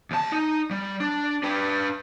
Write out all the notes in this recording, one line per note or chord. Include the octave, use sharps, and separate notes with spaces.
D#2 A5
D#4
G3
D4
D4 B4